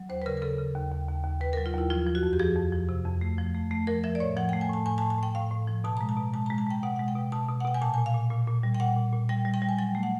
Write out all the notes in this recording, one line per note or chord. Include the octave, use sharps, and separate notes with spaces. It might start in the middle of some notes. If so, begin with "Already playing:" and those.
Already playing: F#3
D#2 C5
B4
C#3 A#4
A#4
C#3 A4
C#3
D#2
D#2
D#2
D#2
D#2 B4
F#3 A#4
F4
D#2 E4
F3 F4
F3
F#4
F2
G4
F3 G#4
F2
F3
C3
F2
A3
F3
A3
A3
F3 A#4
F3 E5
D5
A2 C#5
F3 F#5
A3 G5
G#5
A2 A5
A2 G#5
A5
A2
A5
A2 G5
A2 F5
A2
F3
B2 A5
G#3 A#5
A5
B2
G#3 A5
G#3 A#5
A5
G#3 G5
B2 F#5
G#3 F#5
G5
B2
B2 A5
B2
F#5
B2 G5
G#5
A#2 A5
A#2 G#5
F5
A#2
A#2
A#2
G3
G5
A#2 F#5
A#2
A#2
G3 G5
G3
G5
G3
G#5
F#3 G5
A3
F#5